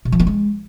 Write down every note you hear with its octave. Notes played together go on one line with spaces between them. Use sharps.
B2
F3
B3
G#3